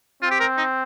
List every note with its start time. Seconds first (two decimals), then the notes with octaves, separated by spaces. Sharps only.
0.22 C4 F4
0.31 G4
0.40 A#4
0.58 D#4